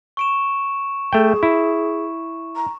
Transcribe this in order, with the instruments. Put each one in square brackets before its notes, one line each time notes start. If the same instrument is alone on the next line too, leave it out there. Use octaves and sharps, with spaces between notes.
[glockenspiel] C#6 D7 E7
[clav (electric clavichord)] A3 G5 [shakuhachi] G#4
[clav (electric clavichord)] E4
[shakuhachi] A#5